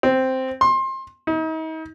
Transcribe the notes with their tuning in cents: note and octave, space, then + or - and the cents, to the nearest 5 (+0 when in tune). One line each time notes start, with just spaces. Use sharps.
C4 +0
C6 +25
D#4 +40